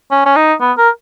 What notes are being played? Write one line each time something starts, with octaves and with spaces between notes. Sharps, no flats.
C#4
C#4
D#4
B3
A#4